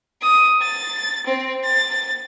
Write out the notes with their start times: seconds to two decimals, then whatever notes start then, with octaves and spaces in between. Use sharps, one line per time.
0.22 D#6
0.62 A6
1.26 C4
1.64 A6